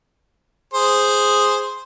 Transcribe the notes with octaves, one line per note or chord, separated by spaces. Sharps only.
G#4 C5